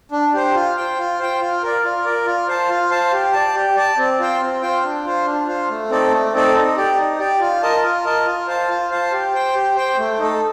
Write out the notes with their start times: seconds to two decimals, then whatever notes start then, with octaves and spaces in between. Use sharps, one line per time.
0.12 D4
0.34 G4 C5
0.55 F4
0.77 C5 G5
0.98 F4
1.19 C5 G5
1.41 F4
1.63 A#4 D5
1.84 F4
2.05 A#4 D5
2.26 F4
2.48 C5 F5 A5
2.69 F4
2.90 C5 F5 A5
3.13 G4
3.33 D5 A5
3.54 G4
3.76 D5 A5
3.98 C4
4.19 F4 C5 G5
4.41 C4
4.62 F4 C5 G5
4.84 D4
5.05 F4 C5
5.26 D4
5.47 F4 C5
5.69 A3
5.90 C4 D#4 A4 D5
6.11 A3
6.33 C4 D#4 A4 D5
6.54 D#4
6.77 G4 D5
6.98 D#4
7.19 G4 D5
7.40 F4
7.62 A#4 D#5 A5
7.83 F4
8.04 A#4 D#5 A5
8.25 F4
8.47 C5 F5 A5
8.69 F4
8.91 C5 F5 A5
9.12 G4
9.34 C5 G5
9.54 G4
9.76 C5 G5
9.98 A3
10.19 D#4 A4